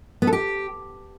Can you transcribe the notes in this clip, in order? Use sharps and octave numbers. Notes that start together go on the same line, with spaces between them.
B3
A4
G4